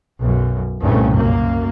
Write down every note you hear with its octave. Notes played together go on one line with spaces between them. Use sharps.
B1 F#2
C2 G2 A#2 C#3 A3 C#4
F#2 A#3